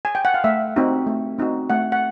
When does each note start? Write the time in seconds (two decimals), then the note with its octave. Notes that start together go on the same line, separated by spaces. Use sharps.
0.05 G#5
0.15 G5
0.25 F#5
0.34 F5
0.44 A3 E5
0.76 C4 D#4 F#4
1.07 A3
1.38 C4 D#4 F#4
1.70 A3 F#5
1.92 F#5